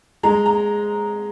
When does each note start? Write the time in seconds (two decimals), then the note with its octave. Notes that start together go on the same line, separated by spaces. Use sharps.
0.23 G#3 A#5
0.46 A#5